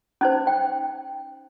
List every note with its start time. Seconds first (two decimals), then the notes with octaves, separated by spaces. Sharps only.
0.21 C#4 D#4 C5
0.47 G5